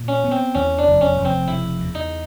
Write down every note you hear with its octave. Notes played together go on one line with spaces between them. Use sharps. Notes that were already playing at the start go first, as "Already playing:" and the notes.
Already playing: A#2
C#4
B3
C4
E2 C#4
D4
F1
C#4
F1
C4
C#3 E4
E2
D#4